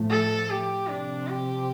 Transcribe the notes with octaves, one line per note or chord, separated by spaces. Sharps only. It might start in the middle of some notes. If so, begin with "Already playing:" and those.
Already playing: A2 F3 A3
A4
G4
C3 F3 C4 D4
G4